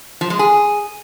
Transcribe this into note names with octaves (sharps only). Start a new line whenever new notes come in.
F3
G#3
G#4